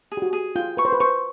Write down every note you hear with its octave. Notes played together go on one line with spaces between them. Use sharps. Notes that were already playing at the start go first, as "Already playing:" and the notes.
G#4
G4
F#4
G#4
F4 G5
B4 C#6
C5
B4
C5 C#6